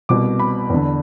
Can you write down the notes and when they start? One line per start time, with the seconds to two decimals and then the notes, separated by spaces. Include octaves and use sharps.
0.09 C2 B2 D6
0.39 B5
0.70 E2 D3